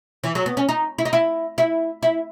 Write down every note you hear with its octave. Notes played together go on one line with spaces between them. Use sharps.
E3
F#3
B3
C#4
D#4
E4
D#4
E4
E4
E4